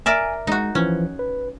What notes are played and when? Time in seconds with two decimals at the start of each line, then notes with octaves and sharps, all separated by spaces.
0.06 A#4 D5 E5 G#5
0.47 G#3 D#4 F#4
0.75 E3 F3 C#4
1.19 B4